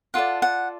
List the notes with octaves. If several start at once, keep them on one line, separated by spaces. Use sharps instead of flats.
F4 A4 D5 F#5
F#5